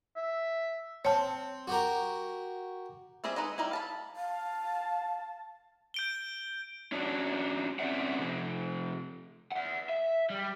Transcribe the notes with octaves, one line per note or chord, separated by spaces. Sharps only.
E5
C4 C#5 A5
F#4 G4 A#4
G3 C4 G#4 D#5 E5
G#3 D#4 B4 D#5
G3 D#4 E4
F5 A5 B5
F5 A5
G6 D7 G7
C#4 D4 F#4
C4 C#4 D5 E5 F#5
C3 F3
E5 F#5
E5
G3